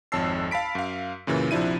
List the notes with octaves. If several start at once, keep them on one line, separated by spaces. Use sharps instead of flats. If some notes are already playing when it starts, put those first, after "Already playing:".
G#1 F2 C#5 A5 E6 C7
F5 A5 B5 B6 D7
F#2 F5
F#2 A#2 C#3 E3
A#1 C3 F3 D4 E4 D#7